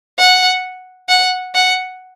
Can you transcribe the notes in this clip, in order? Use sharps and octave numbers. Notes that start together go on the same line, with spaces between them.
F#5
F#5
F#5